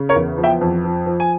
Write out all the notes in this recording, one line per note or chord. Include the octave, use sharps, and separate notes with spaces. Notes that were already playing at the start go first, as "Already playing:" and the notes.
Already playing: C#3
A#4 C#5
E2
F3
E5 G5
F2
F3
F3
G#5